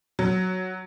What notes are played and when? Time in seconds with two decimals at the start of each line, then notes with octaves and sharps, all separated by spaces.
0.19 F#3